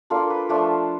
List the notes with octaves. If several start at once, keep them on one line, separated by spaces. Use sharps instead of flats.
A#3 D4 F4 A4
B4
F3 A3 D4 F4